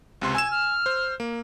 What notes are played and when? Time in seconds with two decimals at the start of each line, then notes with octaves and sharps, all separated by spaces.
0.22 C#2 C3 C6
0.35 G#5 E6 G#6 E7
0.51 F6
0.86 C5
1.20 A#3